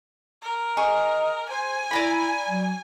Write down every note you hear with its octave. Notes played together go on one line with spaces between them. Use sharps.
A#4
G#4 D#5 C#6
C5 G#5
E4 D5 A#5 B5
F#3